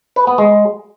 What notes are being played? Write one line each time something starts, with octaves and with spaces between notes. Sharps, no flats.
B4
B3
G#3